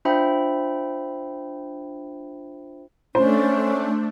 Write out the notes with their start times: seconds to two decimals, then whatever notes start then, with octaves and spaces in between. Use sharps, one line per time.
0.05 D4 F4 C5 E5 G5 B5
3.15 A3 C#4 D4 C5